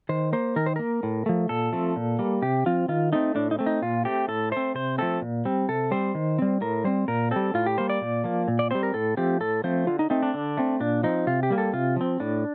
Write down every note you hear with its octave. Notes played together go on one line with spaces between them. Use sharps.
D#3 C5
A#3 C5
D#3 A#4
C5
A#3 A#4
A2
F3 A3
A#2 A4
F3 A3 C4
A#2
G3 A#3
C3 G4
F3 C4 F4
D#3 F4
A3 C4 D#4
A2 D4
D#4
A3 C4
D#4
A#2 F4
A3 C4 G4
A2 A4
A3 C4 C5
C3 C5
F3 A3 C4 A4
A#2
G3 C4
C3 A4
G3 C4 C5
D#3
G3 C4
A2 A#4
G3 C4 C5
A#2 A#4
G3 C4 A4
A2 F4
G4
G3 A#3 C5
D5
A#2
F3 A#3
A#2
D5
G3 C4 C5
A#4
A2 A4
F3 A3 C4 G4
A2 A4
F3 A3 C4 C5
D3 F4
D#4
A3 C4 D#4
D4
D3
A3 C4
A#2 D4
F3 C4 D#4
C3 F4
G4
G3 A#3
A4
C3 F4
F3 C4
A2 D4